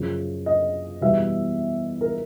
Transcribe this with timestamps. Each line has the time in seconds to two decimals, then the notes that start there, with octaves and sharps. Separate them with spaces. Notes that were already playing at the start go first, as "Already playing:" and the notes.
Already playing: F#2 C#3 F3
0.46 D#5
1.01 E2 B2 G3 E5
2.01 A#4